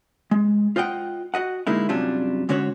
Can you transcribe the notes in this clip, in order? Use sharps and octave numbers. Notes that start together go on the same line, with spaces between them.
G#3
F4 C5 D#5 F#5 G5
F#4 D#5 F#5
D3 G#3 A#3 D#4 E4
F#2 C3 F#3 G3 D4 F4
G#2 D3 C#4 F#4 C5 C#5